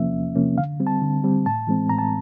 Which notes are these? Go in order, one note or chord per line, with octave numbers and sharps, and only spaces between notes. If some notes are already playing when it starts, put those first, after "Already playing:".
Already playing: E2 C3 F3 A#3 C#4 E5
E2
C3 F3 A#3 C#4
D3 F5
G3 C4
A5
D3
G3 C4
A2 A5
E3 G#3 C4
A2 A#5
A5